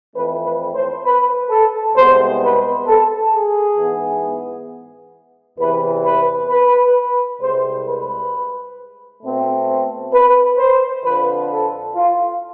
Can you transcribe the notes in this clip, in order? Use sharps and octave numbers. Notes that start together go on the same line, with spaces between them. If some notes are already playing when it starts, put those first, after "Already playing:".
F2 E3 A3 C4 B4
B4
C5
B4
A4
C2 C3 G#3 B3 C5
B4
A4
G#4
G#2 E3 B3
E2 C3 E3 B4
B4
B4
C2 C3 G#3 C5
B4
B2 A3 C4
B4
C5
F2 D3 F3 B4
A4
F4